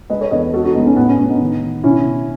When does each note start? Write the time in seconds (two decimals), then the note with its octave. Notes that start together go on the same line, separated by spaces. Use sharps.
0.10 G#3 B4 D#5
0.21 A4 C#5
0.31 E2 B4 D#5
0.54 G#3 F#4 A4
0.64 D#4 F#4
0.75 G#3 B3 D#4
0.86 C#4
0.96 A2 B3
1.08 C#4
1.19 A2 C#4
1.29 B3 D#4
1.41 D#3
1.62 D#3
1.84 B2 C#4 E4
2.05 B2